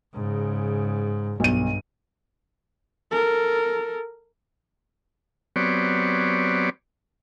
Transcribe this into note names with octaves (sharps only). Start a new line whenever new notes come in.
G#2 C#3
B1 G2 D#7
A4 A#4
F#3 B3 C4 G4 C#5 D5